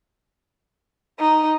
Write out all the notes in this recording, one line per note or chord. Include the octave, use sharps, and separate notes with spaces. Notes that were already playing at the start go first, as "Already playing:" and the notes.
D#4